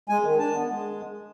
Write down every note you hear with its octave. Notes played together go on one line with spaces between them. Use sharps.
G#3 G#5
D#3
D4 A5
B3
G#3